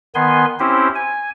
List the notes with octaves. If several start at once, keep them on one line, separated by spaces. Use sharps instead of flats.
D#3 B3 G#5 C6
C4 C#4 E4 G4 C5
G#5